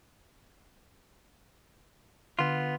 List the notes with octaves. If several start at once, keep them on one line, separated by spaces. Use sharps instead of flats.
D3 B3 F4 C6